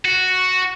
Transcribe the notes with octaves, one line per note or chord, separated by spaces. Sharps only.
F#4